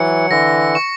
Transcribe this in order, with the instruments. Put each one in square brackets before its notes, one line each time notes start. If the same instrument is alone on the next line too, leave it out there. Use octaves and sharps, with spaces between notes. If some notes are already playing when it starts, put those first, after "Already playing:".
Already playing: [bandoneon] E3 F#3 [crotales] C#7
[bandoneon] D3 E3 [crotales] A#6
[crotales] C#6